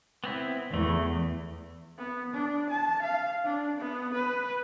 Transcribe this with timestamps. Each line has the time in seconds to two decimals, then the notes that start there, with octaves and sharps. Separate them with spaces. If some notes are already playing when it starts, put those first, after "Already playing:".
0.24 B3 C4 E4
0.74 E2 A3
1.98 B3
2.33 D4
2.70 A5
3.02 F5
3.44 D4
3.78 B3
4.14 B4